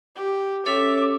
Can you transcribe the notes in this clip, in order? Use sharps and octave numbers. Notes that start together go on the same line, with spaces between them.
G4
C#4 A4 C#5 E5 D6